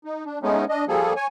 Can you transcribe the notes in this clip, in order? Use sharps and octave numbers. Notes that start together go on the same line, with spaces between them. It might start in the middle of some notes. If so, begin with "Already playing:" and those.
D#4
D4
G#3 A3 B3 C#4 D#4
D4 D#5
F3 G3 A#3 G#4 A4
C#5 G#5